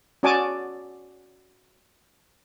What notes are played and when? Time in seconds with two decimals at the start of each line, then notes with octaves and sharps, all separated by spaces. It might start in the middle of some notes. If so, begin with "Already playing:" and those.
0.23 C#4 F#4 D5 G#5 A5 D6